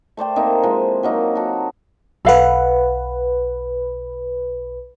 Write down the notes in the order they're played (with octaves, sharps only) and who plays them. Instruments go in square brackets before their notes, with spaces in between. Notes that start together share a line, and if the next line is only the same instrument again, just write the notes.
[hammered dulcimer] A3 C5 D5 G5
A#3 C4 D#4
E3 F3 G#3
F#3 A#3 D#4
F#4 A4
[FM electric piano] B1 B4 [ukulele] A4 F5 F#5